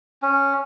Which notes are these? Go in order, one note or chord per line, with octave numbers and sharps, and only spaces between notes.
C#4